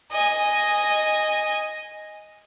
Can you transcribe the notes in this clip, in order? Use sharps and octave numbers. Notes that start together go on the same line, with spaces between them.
D#5 G#5